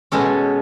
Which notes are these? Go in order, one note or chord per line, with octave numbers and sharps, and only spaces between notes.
B2 G#3 C#4 A4